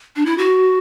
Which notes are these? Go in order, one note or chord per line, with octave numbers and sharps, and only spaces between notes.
D4
E4
F#4